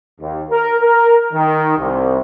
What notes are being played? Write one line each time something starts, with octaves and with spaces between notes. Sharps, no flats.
D#2
A#4
A#4
D#3
C2